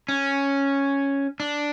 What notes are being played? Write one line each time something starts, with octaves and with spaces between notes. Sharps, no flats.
C#4
D4